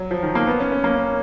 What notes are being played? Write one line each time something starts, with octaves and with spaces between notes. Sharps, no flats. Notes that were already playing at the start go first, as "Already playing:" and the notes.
Already playing: F#3
F3
D#3
A#3
B3
C#4
C#4
A#3
C#4